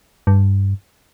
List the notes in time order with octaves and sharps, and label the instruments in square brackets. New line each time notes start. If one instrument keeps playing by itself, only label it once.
[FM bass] G2